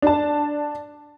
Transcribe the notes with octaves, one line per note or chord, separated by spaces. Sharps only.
D4 A5